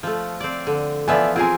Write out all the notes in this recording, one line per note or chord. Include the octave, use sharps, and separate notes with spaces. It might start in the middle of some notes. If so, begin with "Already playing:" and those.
F3 A3
C4 D5
D3
E3 F3 B3 D5 E5 G#5
C4 F4 G#4 A#4 G#5